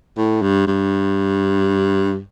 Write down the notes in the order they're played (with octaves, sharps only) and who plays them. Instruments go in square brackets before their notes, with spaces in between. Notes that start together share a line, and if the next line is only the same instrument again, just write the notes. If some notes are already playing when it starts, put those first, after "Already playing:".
[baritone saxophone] A2
G2
G2